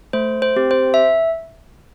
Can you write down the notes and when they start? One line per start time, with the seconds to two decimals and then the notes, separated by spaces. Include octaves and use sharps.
0.13 A3 C5
0.42 C5
0.56 C4 G4
0.71 C5
0.94 E5